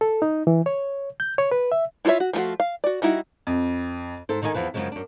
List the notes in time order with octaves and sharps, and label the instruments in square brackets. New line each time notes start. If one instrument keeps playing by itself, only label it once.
[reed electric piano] A4
D#4
E3
C#5
G6
C#5
B4
E5
[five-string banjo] E4 F4 A4 C#5 E5
F#4
F3 A3 C#4 F4 F#4
F5
F#4 D5
G3 D#4 E4 F#4
[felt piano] F2
[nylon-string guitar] G#2 E4 A4 C5
D3 D#3 D#4 D5 G#5
E2 E3 F3 B4
F#2 A#2 C#3 F3 G#3
F#2 D4